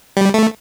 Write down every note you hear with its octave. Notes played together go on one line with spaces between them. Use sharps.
G3
A3